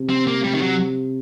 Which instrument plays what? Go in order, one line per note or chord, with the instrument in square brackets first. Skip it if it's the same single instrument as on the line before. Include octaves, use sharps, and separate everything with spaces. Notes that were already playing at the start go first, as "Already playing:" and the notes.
Already playing: [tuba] C3
[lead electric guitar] C4
A#3
G3
D#3
F#3